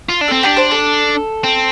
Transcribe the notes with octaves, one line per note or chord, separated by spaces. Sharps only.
F4
D4
C4 A4
D4 G4
C5
A4
C4